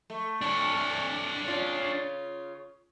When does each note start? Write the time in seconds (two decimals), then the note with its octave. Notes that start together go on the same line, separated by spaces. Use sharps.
0.10 A3
0.42 D4 C#5
1.45 C#3 C#4 F4